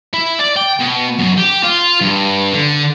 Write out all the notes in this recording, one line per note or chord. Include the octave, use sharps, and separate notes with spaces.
E4
D5
G5
B2
F#2
G4
F4
G2
D3